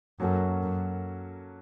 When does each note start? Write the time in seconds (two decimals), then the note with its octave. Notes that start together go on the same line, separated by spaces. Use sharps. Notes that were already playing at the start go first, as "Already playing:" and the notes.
0.20 F#2 F#3 A#3 C#4 F#4 A4
0.63 F#2